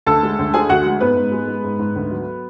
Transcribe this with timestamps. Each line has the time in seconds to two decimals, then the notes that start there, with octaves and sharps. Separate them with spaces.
0.06 D2 A4 A5
0.23 G#3
0.39 D2
0.54 D3 G#4 G#5
0.69 D2 F#4 F#5
0.86 G#3
1.01 G#2 B3 B4
1.16 G#2
1.32 G#3
1.48 G#3
1.64 G#2
1.79 G#2
1.96 D2
2.11 F#3